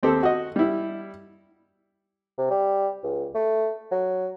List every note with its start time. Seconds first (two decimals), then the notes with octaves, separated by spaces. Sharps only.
0.03 D#2 C4 G4 A4
0.23 F#4 D#5
0.56 G3 E4
2.38 C3
2.50 G3
3.03 C#2
3.35 A3
3.91 F#3